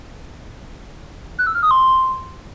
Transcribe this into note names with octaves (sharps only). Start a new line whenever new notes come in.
F#6
E6
F6
D#6
C6